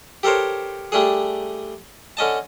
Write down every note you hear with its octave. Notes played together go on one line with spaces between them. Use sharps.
G4 A4 A#4 C5 C#5
G3 A3 D4 G#4
D3 C#4 D#5 A5